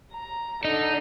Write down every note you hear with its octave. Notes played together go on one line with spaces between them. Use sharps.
A#5
D3 D#4